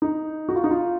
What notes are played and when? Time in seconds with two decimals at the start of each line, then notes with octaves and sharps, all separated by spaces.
0.02 D#4
0.49 F#4
0.56 F4
0.64 D#4
0.71 F4